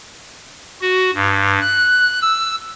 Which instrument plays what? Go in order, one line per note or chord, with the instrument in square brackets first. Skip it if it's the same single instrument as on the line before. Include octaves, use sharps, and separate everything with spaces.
[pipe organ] F#4
G2
F#6
E6